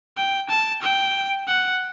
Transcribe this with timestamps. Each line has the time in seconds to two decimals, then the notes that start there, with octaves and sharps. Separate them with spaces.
0.17 G5
0.50 A5
0.82 G5
1.48 F#5